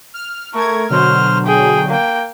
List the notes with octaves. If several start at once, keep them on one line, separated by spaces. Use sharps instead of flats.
F6
A3 A#4 C#6 G#6
B2 D3 F#3 C5 F6
G#4 G5
A#3 G5